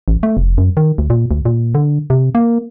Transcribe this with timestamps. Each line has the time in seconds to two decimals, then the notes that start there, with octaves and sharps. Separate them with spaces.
0.08 A1
0.23 A3
0.37 F1
0.58 F#2
0.77 D#3
0.98 D2
1.10 A#2
1.31 D2
1.45 A#2
1.75 D3
2.10 C3
2.35 A#3